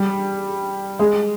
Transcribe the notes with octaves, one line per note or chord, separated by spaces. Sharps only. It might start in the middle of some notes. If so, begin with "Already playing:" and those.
Already playing: G3
G#3